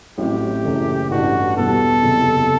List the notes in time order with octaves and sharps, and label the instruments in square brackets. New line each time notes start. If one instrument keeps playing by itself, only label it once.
[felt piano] A1 A2 F#3 C4 [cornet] G4
[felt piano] F#1 F#2 E3 A3
[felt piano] A1 G2 E3 A3 D4 [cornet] F#4
[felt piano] E2 B2 G3 B3 [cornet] A4
[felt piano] F#1 E2 C3